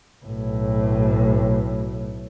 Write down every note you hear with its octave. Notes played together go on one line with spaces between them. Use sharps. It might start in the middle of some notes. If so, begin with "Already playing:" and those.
B1 A2